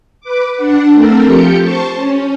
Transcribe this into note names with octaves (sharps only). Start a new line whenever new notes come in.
B4 D6
D4 F#5
A3 C4 A4 A#4
F3 G4 G6 C#7
C5 A5 C#6
C#4